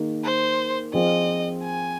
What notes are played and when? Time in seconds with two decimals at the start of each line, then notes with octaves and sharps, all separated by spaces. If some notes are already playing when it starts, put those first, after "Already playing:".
Already playing: D#3 A#3 D#4 G#4
0.24 C5
0.93 F3 C4 F4 G#4 D#5
1.63 G#5